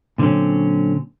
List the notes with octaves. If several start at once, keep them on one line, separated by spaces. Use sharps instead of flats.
A#2 D3 F#3 C4 C#4